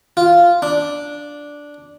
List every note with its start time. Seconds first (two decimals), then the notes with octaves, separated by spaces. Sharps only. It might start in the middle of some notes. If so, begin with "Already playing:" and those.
0.17 F4
0.62 D4